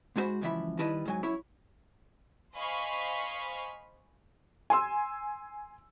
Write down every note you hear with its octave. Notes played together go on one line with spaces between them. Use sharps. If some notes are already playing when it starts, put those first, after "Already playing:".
G#2 G#3 D#4 F#4 C5 B5
C#2 F#2 E3 F3 E5 B5
D#3 G3 E4 B4 D#5 A5
G#2 F#3 G#5
F#2 E4 C#5 B5
C5 D#5 F5 G#5 B5 C#6
G#5 C6 E6